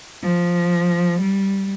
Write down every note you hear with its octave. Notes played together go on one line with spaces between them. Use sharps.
F3
G3